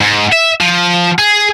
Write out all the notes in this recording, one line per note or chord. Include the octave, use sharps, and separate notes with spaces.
G#2
E5
F3
G#4